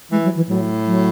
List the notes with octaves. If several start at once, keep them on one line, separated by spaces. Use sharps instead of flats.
E3 G#3
F#3
E3
A2 F#3
F#3